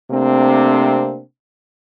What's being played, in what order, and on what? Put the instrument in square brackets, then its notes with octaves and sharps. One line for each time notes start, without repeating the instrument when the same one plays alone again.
[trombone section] C3 A3 A#3 C4 D4